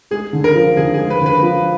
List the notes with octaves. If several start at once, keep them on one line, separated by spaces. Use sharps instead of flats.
G#3 G#4
D3
A#4
F3
D3 G#4
G#3 G#4
B4
D3 B4
F3